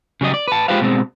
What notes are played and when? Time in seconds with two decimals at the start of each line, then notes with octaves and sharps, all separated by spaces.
0.21 C#3 F#3 G3 D#5
0.34 D5
0.48 B4 A5
0.68 G#3 F4 G4 B4 C5 F5
0.81 B2 G#3 C4